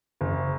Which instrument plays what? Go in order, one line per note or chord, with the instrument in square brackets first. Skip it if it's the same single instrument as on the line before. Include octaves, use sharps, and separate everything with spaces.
[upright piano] F#1